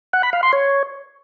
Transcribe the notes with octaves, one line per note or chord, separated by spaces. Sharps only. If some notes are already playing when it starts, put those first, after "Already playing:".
F#5
B5
F5
C6
C#5